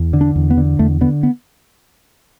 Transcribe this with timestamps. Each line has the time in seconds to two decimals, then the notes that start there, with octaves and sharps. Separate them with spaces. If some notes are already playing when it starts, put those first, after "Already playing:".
Already playing: E2
0.13 D3
0.21 D4
0.36 E2
0.50 B3
0.57 D3
0.79 E2 A3
1.01 D3 B3
1.23 B3